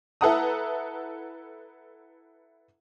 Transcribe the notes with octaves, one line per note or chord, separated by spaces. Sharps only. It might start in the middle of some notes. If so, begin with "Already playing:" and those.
E4 A4 B4 F#5 A#5 D#6